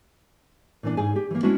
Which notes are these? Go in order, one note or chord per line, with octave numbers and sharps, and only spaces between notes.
A#2 E3 D4
G#2 G#4 F5 G#5
G4
E3 A#3
G#3 C#4 D4 E4 F#4